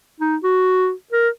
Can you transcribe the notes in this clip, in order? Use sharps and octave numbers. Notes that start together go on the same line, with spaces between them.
D#4
F#4
A#4